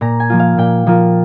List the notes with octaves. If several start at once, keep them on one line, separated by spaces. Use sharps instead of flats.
A#2 A#5
G#5
F3 A#3 F4
F5
A#2 G5
F3 A#3 F4